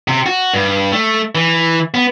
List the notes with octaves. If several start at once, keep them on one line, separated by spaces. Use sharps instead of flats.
C3
F#4
G2
A3
E3
B3